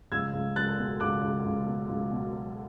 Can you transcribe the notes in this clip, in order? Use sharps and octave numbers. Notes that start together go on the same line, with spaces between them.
C#2 E6 G#6
C#2
C#2 F#6 A6
B2
C#2 D6 F#6
C#2
C#2
B2
C#2
B2
F#3